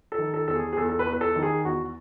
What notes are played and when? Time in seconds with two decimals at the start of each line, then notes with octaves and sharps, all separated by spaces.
0.12 A4
0.18 D#3
0.34 A4
0.48 E2 A4
0.56 G#4
0.73 G#4
0.77 E2 A4
0.89 A4
0.99 B4
1.07 E2
1.13 B4
1.21 A4
1.36 D#3
1.43 G#4
1.65 E2 F#4